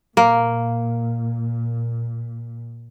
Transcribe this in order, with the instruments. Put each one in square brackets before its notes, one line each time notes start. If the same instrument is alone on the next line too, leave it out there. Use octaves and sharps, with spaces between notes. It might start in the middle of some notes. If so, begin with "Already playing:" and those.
[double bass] A#2 [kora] A#3